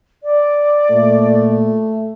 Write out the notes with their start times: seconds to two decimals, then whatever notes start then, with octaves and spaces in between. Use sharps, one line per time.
0.23 D5
0.91 A#2 A3